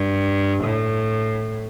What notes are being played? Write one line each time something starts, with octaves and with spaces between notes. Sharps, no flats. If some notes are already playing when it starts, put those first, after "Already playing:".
Already playing: G2
A2